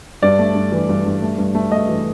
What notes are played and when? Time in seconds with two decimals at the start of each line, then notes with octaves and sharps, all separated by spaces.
0.22 G2 D5
0.39 A3
0.55 G2
0.72 E3
0.89 G2
1.06 G2
1.22 A3
1.38 G2
1.55 A3
1.72 A3 D#5
1.89 E3